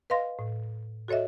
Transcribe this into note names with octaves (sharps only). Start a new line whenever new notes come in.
B4 D#5 F5 C6 A#6
A2
F#4 A4 C#5 D#5 E5